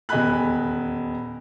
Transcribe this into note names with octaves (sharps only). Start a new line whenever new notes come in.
D#1 E2 D#5 G#5 B5 F#6